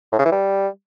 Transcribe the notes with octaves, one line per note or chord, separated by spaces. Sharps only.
A2
C#3
E3
G3